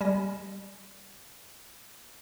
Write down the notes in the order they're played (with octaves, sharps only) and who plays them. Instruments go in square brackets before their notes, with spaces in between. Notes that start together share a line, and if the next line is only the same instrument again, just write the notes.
[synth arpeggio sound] G3 G#5 A#6